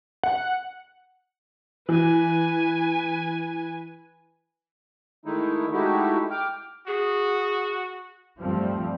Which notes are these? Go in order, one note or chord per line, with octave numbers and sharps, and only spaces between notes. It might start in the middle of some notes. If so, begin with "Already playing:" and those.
F#5
E3 B4 G#5
D#3 G#3 A3 D#4 E4
G#3 A3 D#4 E4 F#4 G4
G5 D6 F6
F#4 G#4
G2 F3 G3 A3 C4